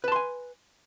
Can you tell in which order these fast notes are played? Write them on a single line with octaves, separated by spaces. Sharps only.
B4 A5 C6 G#5